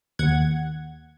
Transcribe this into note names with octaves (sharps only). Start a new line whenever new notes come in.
D#2 F#5 G#6